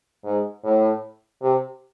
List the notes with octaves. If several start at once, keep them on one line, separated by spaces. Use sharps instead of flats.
G#2
A2
C3